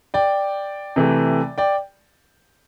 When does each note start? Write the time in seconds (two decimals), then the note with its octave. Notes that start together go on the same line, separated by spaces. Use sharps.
0.14 D5 G5
0.96 C3 E3 A3
1.58 D5 G5